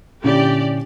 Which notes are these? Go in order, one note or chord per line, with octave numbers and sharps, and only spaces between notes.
A#2 D3 C#4 E4 G4 D5